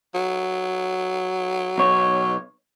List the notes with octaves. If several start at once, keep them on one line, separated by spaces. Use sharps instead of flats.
F#3
B1 C#5